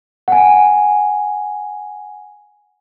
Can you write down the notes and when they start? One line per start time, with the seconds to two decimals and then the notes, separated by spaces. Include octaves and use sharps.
0.28 F#5 G#5